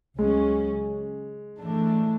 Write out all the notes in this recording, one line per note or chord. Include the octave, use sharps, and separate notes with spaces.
C#2 C#3 F#3 G#3 C#4
A2 E3 A3 D4